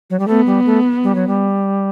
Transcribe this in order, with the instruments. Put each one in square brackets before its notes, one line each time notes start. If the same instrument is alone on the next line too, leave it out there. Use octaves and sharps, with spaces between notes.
[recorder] F#3
G3
[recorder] A3 [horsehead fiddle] B3
[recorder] G3
A3
G3
F#3
G3